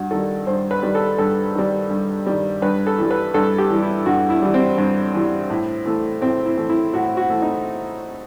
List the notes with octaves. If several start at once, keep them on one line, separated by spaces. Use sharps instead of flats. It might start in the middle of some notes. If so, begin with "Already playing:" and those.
Already playing: G2 F#4
D#3 G3 A4
G2 C5
B4
D#3 G3
A4
G2 A4
D#3 G3
G2
D#3 G3
G2 B4
A4
E3 G3
B4
G2 A4
G4
E3 G3
E4
G2 F#4
E4
E3 G3
C4
G2
E3 G3
A2
E3 A3
A2 C4
E4
E3 A3
E4
A2 F#4
F#4
E3 A3
D#4